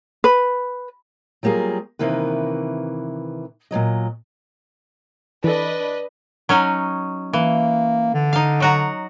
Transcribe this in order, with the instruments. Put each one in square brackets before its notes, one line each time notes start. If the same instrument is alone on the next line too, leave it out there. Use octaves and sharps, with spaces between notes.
[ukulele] B4
[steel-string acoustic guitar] F#3 G3 A#3 F4 G#4
C3 D#3 E3 A#3 B4
A#2 C#3 F#3 D#5
[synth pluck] E3 A4 [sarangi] D4 [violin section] B4 D#5
[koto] F#3 C#4 D#4
[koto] E3 [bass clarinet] A#3
[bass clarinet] D3
[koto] D#4 F5
F#3 F#4 A#5